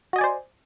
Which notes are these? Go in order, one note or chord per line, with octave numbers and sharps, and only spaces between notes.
F#4 C5 D5 D#5 G#5